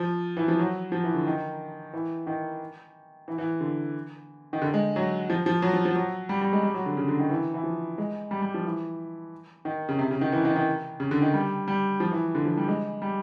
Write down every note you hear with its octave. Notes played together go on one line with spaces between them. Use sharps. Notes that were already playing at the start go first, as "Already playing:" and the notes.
Already playing: F3
E3
F3
F#3
F3
E3
D3
D#3
E3
D#3
E3
E3
D3
D#3
D3
G#3
F#3
F3
F3
F#3
F3
F3
F#3
G3
G3
G#3
G3
F#3
D3
C#3
D3
D#3
E3
E3
F3
G#3
G3
G3
F3
E3
D#3
C#3
C3
C#3
D#3
E3
D#3
D#3
C#3
D3
D#3
G3
G3
F3
E3
D3
F3
G3
G#3
G3